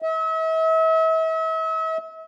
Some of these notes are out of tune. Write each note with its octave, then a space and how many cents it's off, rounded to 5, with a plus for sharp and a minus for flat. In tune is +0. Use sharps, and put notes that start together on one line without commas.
E5 -40